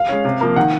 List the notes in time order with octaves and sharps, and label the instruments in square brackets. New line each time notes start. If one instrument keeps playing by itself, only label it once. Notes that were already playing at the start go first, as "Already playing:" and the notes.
Already playing: [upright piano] F5
[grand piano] G#3 C#4
C3
F3 A#3
[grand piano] D#3 [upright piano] F#5